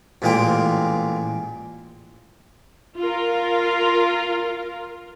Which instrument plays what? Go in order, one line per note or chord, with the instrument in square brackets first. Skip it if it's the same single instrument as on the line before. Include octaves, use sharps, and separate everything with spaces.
[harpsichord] A1 A#2 G#3 A#3 G5 D6
[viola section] F4 A#4